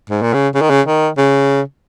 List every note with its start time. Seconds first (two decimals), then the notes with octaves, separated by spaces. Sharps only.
0.10 G#2
0.22 A#2
0.34 C#3
0.55 C#3
0.62 D#3
0.70 C#3
0.87 D#3
1.17 C#3